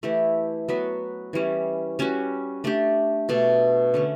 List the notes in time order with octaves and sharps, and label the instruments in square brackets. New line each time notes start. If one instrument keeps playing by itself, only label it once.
[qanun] E3 A3 E4 G4
F#3 B3 F#4 B4
E3 G3 C#4
G3 C#4 F#4
A3 D4 G4
B2 A3 D4
D3 A3 C#4